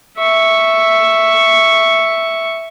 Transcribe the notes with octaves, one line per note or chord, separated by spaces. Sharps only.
E5 C#6